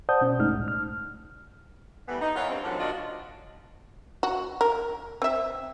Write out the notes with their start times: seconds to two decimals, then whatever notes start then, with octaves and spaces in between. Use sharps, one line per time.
0.09 C5 D5 F#5 A5 D#6 G6
0.21 B2 C#4
0.39 G1 F#2 G#3 A3 D#4 F6
0.53 C2 A2
0.68 F6
2.08 E3 G3 A3 B3
2.21 D#4
2.36 E3 F4 A#4 C#5 E5 F#5
2.50 G2 C4
2.63 G#2 D3 D#3 F3 F#3
2.80 A#2 D4 F4 F#4 D#5
4.23 F#4
4.61 A#4
5.22 C4 E5